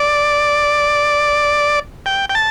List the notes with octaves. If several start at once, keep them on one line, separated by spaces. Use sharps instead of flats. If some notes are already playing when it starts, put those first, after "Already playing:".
Already playing: D5
G5
G5
A5